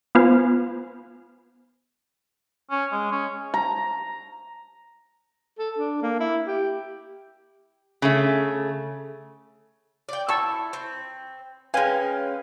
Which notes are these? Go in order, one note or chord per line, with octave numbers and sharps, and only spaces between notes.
B3 F4 B4 C5 F5 G#5
C#4
G#3
C#4
A#5
A4
D4
A#3
E4
G4
C#3 A3
D5 G5
E4 A5 C#6 E6
C4
G#3 C#4 B4 F5 G5 G#5